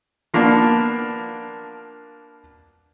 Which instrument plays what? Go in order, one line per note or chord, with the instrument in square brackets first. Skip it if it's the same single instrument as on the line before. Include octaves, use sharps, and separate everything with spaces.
[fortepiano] F3 A#3 B3 D4